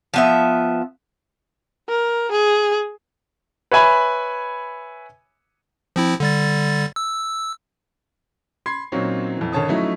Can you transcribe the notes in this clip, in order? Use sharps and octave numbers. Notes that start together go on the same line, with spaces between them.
F3 B3 E5
A#4
G#4
B4 C#5 E5 G#5 B5
F3 C4 E4
D3 G3 A6
E6
B5 C6 G#6 C7
A#2 F#3 C4 C#4 D#4
F2 E3
G#1 D3 C#4 C#5 A5 D#6
F3 F#3 A3 C#4 D#4 E4